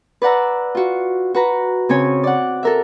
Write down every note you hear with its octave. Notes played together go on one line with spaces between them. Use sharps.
B4 D5 F#5 A#5 E6
F4 F#4
F#4 B4 A#5
C#3 C4 C#4 C#5 G#5
D5 F#5
A4 A#4 E5